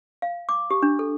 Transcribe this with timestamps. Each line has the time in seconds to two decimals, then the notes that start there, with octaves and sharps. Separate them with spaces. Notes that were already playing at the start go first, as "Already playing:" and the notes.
0.22 F5
0.49 D6
0.71 G4
0.82 D4
0.99 A4